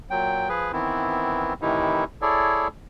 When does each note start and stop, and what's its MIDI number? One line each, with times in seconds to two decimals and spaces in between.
0.10 0.49 46
0.10 0.49 54
0.10 0.49 79
0.49 0.72 53
0.49 0.72 68
0.49 0.72 71
0.73 1.53 51
0.73 1.53 52
0.73 1.53 59
0.73 1.53 60
0.73 1.53 64
1.61 2.04 45
1.61 2.04 48
1.61 2.04 51
1.61 2.04 52
1.61 2.04 63
1.61 2.04 64
2.22 2.68 64
2.22 2.68 68
2.22 2.68 69
2.22 2.68 73
2.22 2.68 74